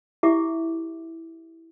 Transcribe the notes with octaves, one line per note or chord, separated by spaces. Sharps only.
E4 G4 E5 D6